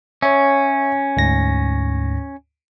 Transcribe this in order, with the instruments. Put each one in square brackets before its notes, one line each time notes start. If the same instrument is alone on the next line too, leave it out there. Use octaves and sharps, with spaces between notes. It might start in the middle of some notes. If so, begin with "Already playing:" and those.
[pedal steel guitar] C#4 [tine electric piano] C#5 E5
[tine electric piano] D2 G#2 A#6